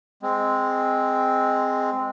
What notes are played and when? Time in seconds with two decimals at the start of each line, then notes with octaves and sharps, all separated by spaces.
0.23 G#3 C4